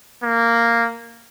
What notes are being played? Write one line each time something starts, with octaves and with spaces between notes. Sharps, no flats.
A#3